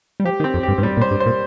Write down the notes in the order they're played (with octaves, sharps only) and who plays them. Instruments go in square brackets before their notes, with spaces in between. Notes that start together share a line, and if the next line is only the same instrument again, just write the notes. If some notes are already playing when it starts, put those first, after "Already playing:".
[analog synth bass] G3
[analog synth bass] F3 [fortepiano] G4
[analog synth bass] D#3
[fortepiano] C4
[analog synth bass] F2
[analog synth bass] G2 [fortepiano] G4
[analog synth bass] G2
[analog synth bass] A2 [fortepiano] G3
[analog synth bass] A#2
[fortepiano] C5
[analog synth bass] G2
[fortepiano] C5
[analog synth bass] A#2